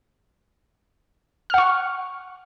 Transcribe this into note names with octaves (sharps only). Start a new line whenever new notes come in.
F#5 C#6 F6